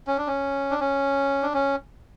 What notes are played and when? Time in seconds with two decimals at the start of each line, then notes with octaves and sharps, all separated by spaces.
0.07 C#4
0.18 D4
0.27 C#4
0.71 D4
0.80 C#4
1.43 D4
1.54 C#4